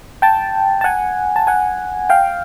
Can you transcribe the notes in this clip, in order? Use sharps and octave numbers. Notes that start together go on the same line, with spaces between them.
G5 A5
A5
F#5 G#5
A5
F#5 G#5
F5 G5